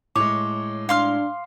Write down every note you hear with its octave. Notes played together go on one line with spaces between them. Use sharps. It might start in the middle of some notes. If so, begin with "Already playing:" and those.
A2 G#3 C#5 D6
D4 F5 C6 F6